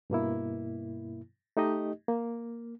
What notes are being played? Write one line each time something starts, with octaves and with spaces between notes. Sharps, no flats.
G2 B2 A#3 E4
A3 D#4 G4 D#5
A#3